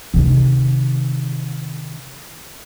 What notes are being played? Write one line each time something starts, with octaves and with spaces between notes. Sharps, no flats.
C3 D#3